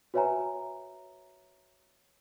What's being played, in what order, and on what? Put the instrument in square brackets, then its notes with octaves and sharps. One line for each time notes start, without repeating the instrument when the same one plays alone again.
[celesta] F#4 B4 C#5 E5 G#5 A#5